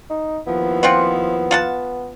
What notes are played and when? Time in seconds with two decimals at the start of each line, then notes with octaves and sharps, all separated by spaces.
0.10 D#4
0.47 D#2 F3 B3 E4
0.83 C4 F4 F#5
1.51 F4 F#5 A5